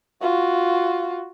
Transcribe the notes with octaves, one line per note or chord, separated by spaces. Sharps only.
F4 F#4